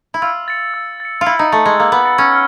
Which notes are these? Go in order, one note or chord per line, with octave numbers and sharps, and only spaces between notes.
E4
F4 E6
A6 C#7
E6
A6 C#7
F4
E4 E6
D#4
A3 A6 C#7
G#3
A#3 E6
B3
A6 C#7
C#4
F6